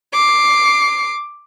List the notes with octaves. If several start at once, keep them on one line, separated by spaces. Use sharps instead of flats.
D6 C7